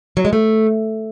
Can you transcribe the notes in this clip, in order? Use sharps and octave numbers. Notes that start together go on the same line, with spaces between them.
F#3
G#3
A3